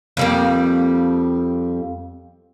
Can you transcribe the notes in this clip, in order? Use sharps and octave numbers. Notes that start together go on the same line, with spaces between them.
F2 G3 A#3